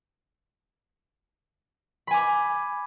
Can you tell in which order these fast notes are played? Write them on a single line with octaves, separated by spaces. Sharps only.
B5 G#5 D6